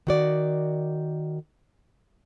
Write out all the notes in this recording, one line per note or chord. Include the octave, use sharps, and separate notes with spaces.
D#3 F#4 D5